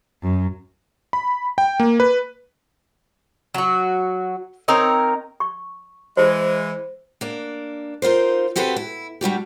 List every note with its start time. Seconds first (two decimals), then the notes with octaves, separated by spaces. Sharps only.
0.23 F#2
1.13 B5
1.58 G5
1.80 A#3
2.00 B4
3.54 F#3 F#4
4.68 C4 D#4 A#4 C#5
5.40 C#6
6.17 E3 G#3 C5
7.21 A#3 D4
8.02 D#4 F4 A#4 C5
8.56 C4 F#4 G4 A4 B4 C5
8.76 E4
9.21 G3 D4 F#4 G4